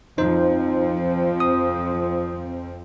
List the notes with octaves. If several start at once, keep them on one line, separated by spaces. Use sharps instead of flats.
F2 F3 C4 D#4 C5
D#6